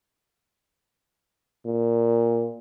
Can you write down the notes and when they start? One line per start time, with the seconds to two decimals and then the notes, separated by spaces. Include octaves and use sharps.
1.66 A#2